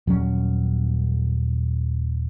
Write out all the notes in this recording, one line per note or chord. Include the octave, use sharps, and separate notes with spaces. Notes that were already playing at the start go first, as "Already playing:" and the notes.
D#1 F#3 C#4